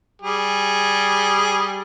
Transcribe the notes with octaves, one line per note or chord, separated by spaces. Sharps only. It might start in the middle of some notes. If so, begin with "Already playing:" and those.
G3 G#4